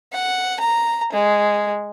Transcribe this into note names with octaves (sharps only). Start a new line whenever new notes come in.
F#5
A#5
G#3